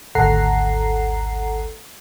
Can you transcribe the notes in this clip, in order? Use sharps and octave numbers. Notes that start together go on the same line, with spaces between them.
G#1 D2 A4 F#5 A#5 C7